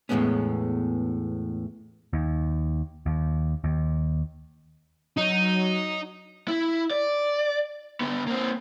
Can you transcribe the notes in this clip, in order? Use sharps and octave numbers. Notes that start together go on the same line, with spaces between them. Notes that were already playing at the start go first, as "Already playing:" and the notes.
E2 A2 C#3 G#3 B3 C#4
D#2
D#2
D#2
F#3 D#4
E4
D5
D3 B3
A#3 C4